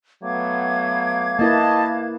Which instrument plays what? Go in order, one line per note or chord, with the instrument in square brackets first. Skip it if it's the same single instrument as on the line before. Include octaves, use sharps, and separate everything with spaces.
[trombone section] F#3 A3 B3 [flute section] F5 D6 G#6
[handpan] A#3 E4 B4 [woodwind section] D#5 A5